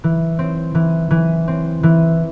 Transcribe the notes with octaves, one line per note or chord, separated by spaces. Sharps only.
E3
C4
E3
E3
C4
E3